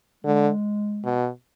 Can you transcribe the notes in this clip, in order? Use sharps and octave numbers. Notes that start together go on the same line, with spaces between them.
D3 G#3
B2